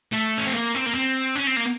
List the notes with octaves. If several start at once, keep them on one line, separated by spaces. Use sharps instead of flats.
A3
C#4
C4
A#3
C4
A#3
C4
C#4
C4
A#3